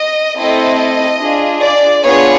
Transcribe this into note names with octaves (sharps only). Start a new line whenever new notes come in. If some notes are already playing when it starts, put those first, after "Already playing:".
Already playing: D#5
A3 C4 E4 A4 D#5
D4 F4 G#4
D5
B3 D4 F4 G#4 C#5